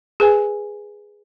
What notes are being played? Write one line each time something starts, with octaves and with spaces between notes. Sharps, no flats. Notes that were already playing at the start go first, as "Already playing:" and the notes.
G#4 B4 G#5